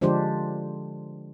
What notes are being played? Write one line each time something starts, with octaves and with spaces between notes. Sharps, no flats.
D3 F3 G#3 D4 G4 C5